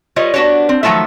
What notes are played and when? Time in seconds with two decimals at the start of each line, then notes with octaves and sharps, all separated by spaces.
0.16 G3 F4 B4 C#5 D#5
0.34 B3 D4 F#4 G4 C#5
0.69 C4
0.83 D#3 F3 F#3 A3 F4 E5